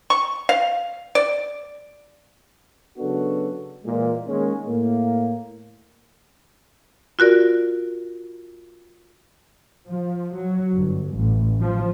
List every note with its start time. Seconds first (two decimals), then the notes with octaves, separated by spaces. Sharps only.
0.10 C#6
0.49 F5
1.15 D5
2.98 C#3 F#3 B3 D4 F#4 A4
3.84 A#2 E3 G#3
4.25 D#3 G#3 A#3 C#4
4.66 A2 A#3
7.19 F4 F#4 A#4 D5
9.87 F3
10.36 F#3
10.75 G1
11.15 A1
11.61 F3